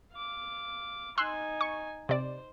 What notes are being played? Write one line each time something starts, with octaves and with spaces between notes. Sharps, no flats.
F5 D6
D#4 G#5 C6 E6 F#6
C#6
C3 C5 D5